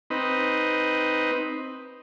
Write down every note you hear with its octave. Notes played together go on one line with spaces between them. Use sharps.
C4 D#4 B4